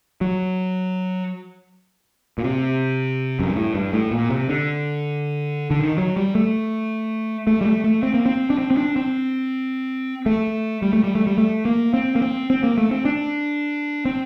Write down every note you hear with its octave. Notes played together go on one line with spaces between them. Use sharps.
F#3
A#2
C3
F#2
G2
A2
G2
A2
A#2
C3
D3
D3
D#3
F#3
G3
A3
A3
G3
A3
A3
C4
A#3
C4
D4
C4
C4
D4
C4
A3
G3
A3
G3
A3
G3
A3
A#3
C4
A#3
C4
C4
A#3
A3
C4
D4
C4